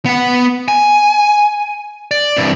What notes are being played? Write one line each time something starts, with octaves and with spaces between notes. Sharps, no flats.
B3 F#5
G#5
D5
C2 G2